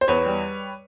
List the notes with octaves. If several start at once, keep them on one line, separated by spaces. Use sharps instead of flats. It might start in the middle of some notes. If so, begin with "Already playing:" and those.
C5
E2 B4 C#5
G3